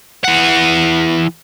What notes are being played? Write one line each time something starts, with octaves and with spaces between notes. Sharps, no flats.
E3 F#5